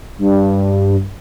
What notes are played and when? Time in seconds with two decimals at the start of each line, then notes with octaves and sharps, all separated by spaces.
0.18 G2